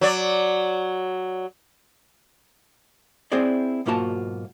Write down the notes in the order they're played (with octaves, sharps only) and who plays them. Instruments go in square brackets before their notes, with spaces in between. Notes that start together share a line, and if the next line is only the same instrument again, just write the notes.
[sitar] F#3 D5
[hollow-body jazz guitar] C4 E4 G#4 C5 D5
B1 G#2 A#3 F4 F#4 A5